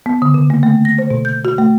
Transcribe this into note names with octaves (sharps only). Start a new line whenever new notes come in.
B3
D3
C#3
A#3
A3
A#6
C5
B2
G6
F#4
A3